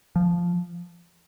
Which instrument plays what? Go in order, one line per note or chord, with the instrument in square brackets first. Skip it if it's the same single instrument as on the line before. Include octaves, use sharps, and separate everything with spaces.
[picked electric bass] F3